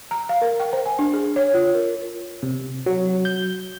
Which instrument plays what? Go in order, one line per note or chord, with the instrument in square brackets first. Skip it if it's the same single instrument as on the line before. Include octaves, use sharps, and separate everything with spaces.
[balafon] A#5
F5
A#4
G5
C5
G#5
D4
G#4
C#5
F4
A#4
[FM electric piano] C3
F#3
G6